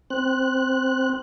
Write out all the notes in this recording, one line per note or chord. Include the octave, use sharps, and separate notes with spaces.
C4 F#6